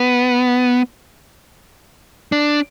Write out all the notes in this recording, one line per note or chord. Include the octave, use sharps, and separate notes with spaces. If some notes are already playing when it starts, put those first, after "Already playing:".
Already playing: B3
D4